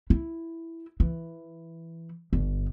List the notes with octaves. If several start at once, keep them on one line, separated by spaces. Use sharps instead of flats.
E4
E3
G1